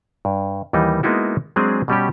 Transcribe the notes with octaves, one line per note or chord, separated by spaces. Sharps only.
G2
D#2 E3 G3 D#4
G#3 A#3 B3 D#4 E4 F#4
F#3 G#3 C4 D4 G#4
B2 G3 C#4 G4